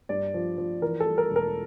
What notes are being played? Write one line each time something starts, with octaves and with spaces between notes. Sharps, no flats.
G2 D5
F3
F3
E3 A#4
A4
G3
A#4
E1
A#4